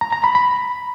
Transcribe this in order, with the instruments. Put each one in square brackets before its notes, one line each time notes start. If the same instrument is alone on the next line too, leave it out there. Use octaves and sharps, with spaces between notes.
[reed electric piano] A#5
A#5
B5
B5